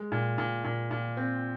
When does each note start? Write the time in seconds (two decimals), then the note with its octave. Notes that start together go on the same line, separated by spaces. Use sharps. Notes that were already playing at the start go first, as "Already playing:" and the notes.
Already playing: G#3
0.12 A#2
0.38 A#2
0.64 A#2
0.91 A#2
1.17 C4